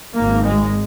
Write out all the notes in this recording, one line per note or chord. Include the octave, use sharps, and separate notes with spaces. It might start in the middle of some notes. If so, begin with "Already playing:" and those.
G#1 G#2 A#3
G#3